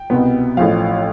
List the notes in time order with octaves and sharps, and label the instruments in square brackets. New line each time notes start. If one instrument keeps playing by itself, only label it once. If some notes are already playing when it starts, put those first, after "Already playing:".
Already playing: [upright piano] G5
C2 B2 B3
A1 A2 F3 F5